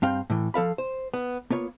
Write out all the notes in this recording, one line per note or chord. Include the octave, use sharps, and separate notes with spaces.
G2 C4 F5 G5
A2 E3
F3 A4 F5 B5
C5
B3
A#3 B3 F4 C#5